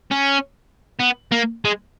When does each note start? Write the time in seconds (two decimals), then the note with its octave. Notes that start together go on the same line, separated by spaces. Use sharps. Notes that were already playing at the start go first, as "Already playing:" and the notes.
0.11 C#4
1.00 B3
1.32 A#3
1.65 G#3